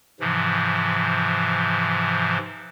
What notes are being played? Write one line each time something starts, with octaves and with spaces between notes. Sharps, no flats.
G#2 C3 E3 F3